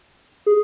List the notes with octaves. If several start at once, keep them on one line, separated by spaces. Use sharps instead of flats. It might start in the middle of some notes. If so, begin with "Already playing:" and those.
G#4